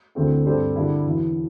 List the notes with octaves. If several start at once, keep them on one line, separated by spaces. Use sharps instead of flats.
D2 D3 A3 C4 E4
G2 G3 C4 A4 C5
D3 G3 E4
E1 E2 E3